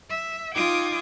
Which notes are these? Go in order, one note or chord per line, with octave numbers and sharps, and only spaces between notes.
E5
D#4 F4 G5 D6 D#6 G#6